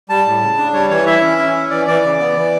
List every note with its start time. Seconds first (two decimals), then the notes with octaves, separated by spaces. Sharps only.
0.09 G3 A5
0.25 A2
0.41 C#3
0.58 D4
0.73 G3 C#5
0.90 E3 C#5
1.06 E4 E5
1.22 C#4
1.39 E4
1.55 C#4
1.71 E3 D5
1.87 E3 D5
2.04 C#3
2.20 B3
2.36 E3